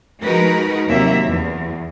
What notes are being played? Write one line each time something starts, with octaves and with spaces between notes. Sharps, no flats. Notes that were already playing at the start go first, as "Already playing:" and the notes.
F3 G#3 D#4 F#4 A#4 B4
D#2 C3 F#3 A#3 E5
E2